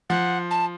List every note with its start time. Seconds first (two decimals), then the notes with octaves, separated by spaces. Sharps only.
0.09 F3 F#5
0.50 A5